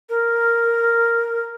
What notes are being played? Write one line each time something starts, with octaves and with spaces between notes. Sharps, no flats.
A#4